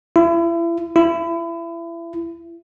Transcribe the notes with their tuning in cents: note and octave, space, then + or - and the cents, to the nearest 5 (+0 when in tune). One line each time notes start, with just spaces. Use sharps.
E4 +35
E4 +30